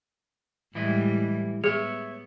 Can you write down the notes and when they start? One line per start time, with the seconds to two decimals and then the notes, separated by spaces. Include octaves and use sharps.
0.75 A2 E3 G3 G#3 E4 D#5
1.64 B3 G#4 C#5 E5